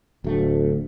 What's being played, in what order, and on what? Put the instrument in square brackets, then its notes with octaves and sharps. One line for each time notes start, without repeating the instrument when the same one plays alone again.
[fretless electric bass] D1 A3 [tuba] D2